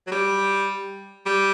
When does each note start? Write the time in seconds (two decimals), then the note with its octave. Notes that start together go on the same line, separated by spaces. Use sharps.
0.07 F#3
0.11 G3
1.26 G3